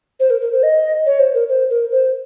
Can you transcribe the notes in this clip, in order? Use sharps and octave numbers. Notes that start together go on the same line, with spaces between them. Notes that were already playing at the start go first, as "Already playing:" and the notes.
C5
A#4
A#4
C5
D#5
C#5
C5
A#4
C5
A#4
C5